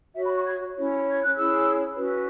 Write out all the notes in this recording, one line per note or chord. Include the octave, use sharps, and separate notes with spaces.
F#4 C#5 E5
B5
C#6
G#6
C#4 E4 C#5
G#6
F#6
C#4 E4 G#4 C#5 E6
C#4 F#4 B4